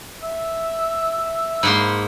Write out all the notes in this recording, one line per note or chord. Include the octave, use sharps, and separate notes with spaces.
E5
G#2 A#3 B5 C6